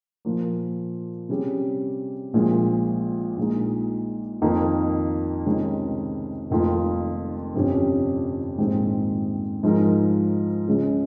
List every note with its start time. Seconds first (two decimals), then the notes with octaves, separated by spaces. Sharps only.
0.25 A#2 F3 A#3
1.29 C3 G3 C#4 G#4
2.34 A#1 A#2 F3 G#3
3.37 A#1 A#2 G#3 D#4
4.42 F2 D#3 A#3 D#4
5.46 C#2 C3 D#3 G#3 C#4
6.50 F1 F2 D#3 A#3 F4
7.55 G1 F2 C3 G3 C#4
8.58 A#1 G#2 D#3 G#3 C4
9.63 G#2 F3 G#3 D#4 A#4
10.67 C#2 C#3 G#3 C#4 G#4